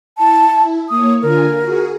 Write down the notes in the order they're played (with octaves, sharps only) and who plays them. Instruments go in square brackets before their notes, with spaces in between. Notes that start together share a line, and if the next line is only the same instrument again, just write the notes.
[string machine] E4 [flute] A5
[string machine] A#3 C#5 [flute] D#6
[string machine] D3 F4 G#5 [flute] A#4
[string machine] F#4 G#4